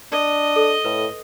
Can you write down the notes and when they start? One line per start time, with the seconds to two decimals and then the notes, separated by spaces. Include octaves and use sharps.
0.12 D4 D#5
0.56 A4
0.85 A2 B4